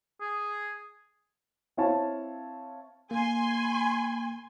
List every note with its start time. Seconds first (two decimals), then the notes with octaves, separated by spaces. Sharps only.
0.21 G#4
1.77 C4 E4 C#5 F5 A5
3.11 A#3 G#5 C6